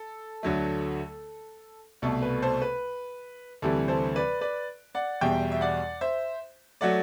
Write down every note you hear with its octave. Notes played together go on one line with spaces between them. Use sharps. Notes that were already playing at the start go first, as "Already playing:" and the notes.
Already playing: A4
D2 D3 F#3 A3
C2 B2 A3 A4
B4
A4 C5
B4
D2 C3 E3 G3 A4
A4 C5
B4 D5
B4 D5
D5 F#5
E2 B2 G3 E5 G5
E5
D5 F#5
C5 E5
F#3 A3 D5 F#5